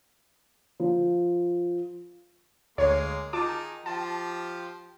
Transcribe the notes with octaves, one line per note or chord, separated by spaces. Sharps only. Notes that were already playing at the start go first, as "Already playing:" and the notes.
F3
D2 G#3 A#3 C#5
D#3 D#4 F4 G#4 A5 D6
F3 G4 A5